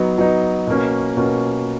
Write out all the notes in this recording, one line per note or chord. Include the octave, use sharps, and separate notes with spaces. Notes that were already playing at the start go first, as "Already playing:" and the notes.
Already playing: F#3 B3 D#4
F#3 B3 D#4
B2 A#3 C#4
B2 A#3 C#4